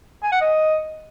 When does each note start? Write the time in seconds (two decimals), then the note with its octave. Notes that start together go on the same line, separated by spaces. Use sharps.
0.23 G#5
0.32 F#5
0.41 D#5